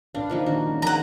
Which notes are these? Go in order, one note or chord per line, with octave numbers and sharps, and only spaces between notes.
A#2 D4 B4 F5
D#3 F3 A#3
D4 F#4 D5
G#3 C#4
D#3 F3 A#4 F#5 A#5